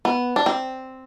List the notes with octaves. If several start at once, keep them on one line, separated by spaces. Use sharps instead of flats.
B3
D4
C4